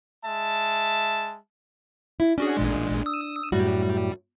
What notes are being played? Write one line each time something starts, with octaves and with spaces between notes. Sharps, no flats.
G#3 E5 A5
E4
C#4 D4 F#4 G#4
A1 A#2 G#3
D#6 E6
F#2 A2 G3 F#4